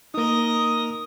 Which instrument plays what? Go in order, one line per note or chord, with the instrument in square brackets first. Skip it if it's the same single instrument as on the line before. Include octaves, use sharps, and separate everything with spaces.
[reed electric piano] A#3 D#4 [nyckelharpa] A#4 D#5 [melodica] D#6